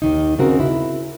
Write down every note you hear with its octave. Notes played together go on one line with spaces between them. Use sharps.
D#2 D#3 D#4
C#3 C4 F#4 A#4
E4